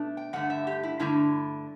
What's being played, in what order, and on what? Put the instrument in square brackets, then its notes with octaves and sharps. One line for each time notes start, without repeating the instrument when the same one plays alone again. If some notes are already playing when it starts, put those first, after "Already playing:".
Already playing: [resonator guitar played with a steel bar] B2 A3 D4
G5
G2 D3 A3 F#5
E5
G4
E4
G2 D3 A3 E4